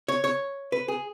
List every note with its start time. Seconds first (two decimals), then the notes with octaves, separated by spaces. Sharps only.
0.08 C#5
0.24 C#5
0.72 B4
0.88 G#4